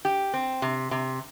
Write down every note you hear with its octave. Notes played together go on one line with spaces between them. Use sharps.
G4
C4
C3
C3